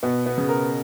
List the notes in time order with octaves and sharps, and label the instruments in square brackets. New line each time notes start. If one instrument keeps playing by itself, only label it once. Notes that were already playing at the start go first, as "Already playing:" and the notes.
[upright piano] B2 [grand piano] B3
[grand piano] B3
[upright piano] C#3
[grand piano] A#4